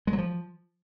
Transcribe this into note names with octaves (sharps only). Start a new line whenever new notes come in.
G#3
F#3
F3